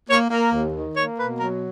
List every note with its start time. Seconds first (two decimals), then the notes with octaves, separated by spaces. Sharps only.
0.09 A#3 C#5
0.31 A#3 A#4
0.52 D#2
0.74 D#3
0.96 A#3 C#5
1.17 B2 B4
1.40 F#3 A#4